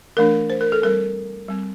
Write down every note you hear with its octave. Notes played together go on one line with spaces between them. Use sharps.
E3 A3 D4 A#4
C5
A#4
A4
G3 C4 A#4
G3 C4